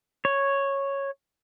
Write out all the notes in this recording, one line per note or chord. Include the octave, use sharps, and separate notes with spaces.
C#5